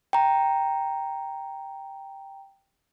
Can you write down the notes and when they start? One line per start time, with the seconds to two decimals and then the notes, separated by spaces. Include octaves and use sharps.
0.13 G5 A#5